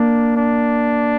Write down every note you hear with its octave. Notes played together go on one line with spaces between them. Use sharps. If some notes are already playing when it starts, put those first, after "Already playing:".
Already playing: A#3 D4
D4